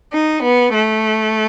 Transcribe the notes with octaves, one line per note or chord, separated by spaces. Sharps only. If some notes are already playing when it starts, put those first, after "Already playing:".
D#4
B3
A3